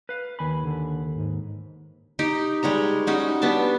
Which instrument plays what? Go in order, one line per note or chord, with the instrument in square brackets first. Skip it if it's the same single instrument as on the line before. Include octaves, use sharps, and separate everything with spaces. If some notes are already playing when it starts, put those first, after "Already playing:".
[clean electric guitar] B4 F5
D#2 G#5 B5
[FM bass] D3
G#2
[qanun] D#4 G4
G3 G#3 C#5 A#5
G3 C#4 D#4 F#4
G3 B3 D4 A5